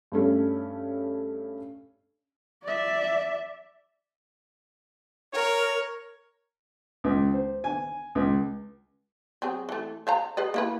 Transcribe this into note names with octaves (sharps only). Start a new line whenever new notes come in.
G2 A3 C#4
D5 E5
A#4 C#5
C#2
C5
G#5
C#2
F#3 C4 G#4
E3 A3
C5 F5 A#5
G#4 B4 D#5
A#3 E4 B4